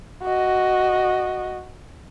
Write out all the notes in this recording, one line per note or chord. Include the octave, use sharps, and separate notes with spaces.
F#4 D#5